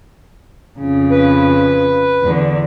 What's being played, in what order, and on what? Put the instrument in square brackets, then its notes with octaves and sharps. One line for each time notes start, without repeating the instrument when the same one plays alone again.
[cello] F2 C#3
[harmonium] B4
[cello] E2 D3